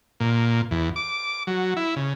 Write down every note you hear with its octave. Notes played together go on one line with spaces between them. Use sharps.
A#2
E2
D6
F#3
E4
C#3